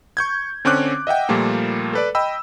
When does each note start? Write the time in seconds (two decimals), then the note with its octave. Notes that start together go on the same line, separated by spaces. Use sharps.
0.17 C#6 G6 G#6
0.65 D3 C4 C#4 C#5 D6 F#6
1.07 D#5 E5 F#5 G5
1.29 A#2 F3 G3 A3 A#3
1.93 A4 B4 D5
2.15 D#5 G5 B5 E6